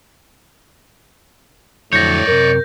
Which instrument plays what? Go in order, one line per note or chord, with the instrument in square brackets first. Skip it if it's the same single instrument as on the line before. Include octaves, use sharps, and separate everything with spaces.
[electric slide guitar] F2 D3 F#3 [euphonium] A2 [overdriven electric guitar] C#5 D5 [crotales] G6 A#6
[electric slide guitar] F#2 C3 [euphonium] A#4